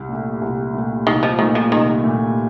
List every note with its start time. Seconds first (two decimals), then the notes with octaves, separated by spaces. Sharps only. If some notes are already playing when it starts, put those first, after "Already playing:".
Already playing: C2
0.09 A#2 A3
0.41 C2
0.74 A#2 A3
1.06 C2 D#3
1.23 F3
1.39 A#2 D#3 A3
1.55 F3
1.71 C2 D#3
2.04 A#2 A3